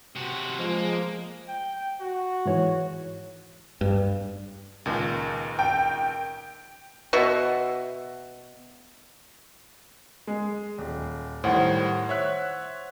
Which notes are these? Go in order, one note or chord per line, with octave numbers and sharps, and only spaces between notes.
C3 F#4 F#6
F3 G#3 A#3
G5
F#4
G#2 E3 C#5
G2
C#2 A#2 D#3
G5
B2 F#4 E5
G#3
D#1
A2 D#3 G3 C5 F#5
C#5 E5 F#6